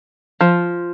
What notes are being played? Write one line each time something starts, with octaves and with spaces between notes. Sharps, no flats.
F3